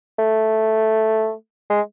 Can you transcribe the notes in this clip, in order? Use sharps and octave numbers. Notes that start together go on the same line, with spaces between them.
A3
G#3